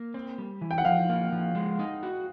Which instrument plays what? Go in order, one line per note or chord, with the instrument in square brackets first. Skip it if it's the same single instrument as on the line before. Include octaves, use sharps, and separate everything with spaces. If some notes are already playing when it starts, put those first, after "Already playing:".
Already playing: [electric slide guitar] A#3
C4
G3
E3
[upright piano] G5
F#5
[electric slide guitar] F3 [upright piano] F5
[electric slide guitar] A#3
F3
G#3
D#4
F#4